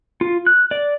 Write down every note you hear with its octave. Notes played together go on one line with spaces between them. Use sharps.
F4
F#6
D5